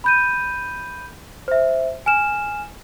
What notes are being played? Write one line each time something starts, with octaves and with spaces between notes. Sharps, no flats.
B5 G6 D#7
C5 E5
G#5 F6 E7